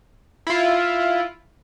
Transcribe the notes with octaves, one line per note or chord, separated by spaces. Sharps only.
E4 F4